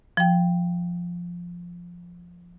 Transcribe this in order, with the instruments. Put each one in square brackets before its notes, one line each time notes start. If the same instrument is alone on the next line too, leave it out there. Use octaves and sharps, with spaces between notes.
[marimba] F3 G5